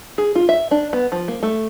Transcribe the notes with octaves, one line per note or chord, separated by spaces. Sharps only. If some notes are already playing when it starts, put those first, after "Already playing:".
G#4
F4
E5
D4
B3
F3
A#3
A3